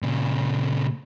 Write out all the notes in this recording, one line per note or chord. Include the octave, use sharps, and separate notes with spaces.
A#2 C#3